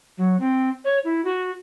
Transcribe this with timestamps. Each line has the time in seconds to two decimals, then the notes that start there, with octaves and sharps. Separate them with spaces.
0.18 F#3
0.40 C4
0.85 C#5
1.04 E4
1.25 F#4